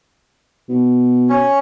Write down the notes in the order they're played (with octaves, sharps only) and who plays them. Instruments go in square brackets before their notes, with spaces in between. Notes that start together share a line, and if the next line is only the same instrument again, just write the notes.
[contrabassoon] B2
[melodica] C#4